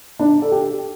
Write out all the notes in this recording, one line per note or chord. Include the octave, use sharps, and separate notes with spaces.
D4
A4
G4